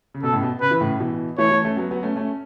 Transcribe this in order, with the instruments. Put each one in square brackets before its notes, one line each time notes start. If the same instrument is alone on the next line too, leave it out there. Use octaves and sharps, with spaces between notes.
[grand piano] C#3
[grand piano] B2 [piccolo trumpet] A4
[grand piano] A2 C#3
B2
[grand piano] C#3 [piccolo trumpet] B4
[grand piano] E3
A2 C#3
B2 E3
[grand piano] E3 A3 [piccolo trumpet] C#5
[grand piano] E3 A3
A3 C#4
F#3 B3
F#3 B3
A3 C#4
A3 C#4